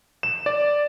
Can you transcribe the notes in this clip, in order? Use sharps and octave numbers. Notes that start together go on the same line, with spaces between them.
E7
D5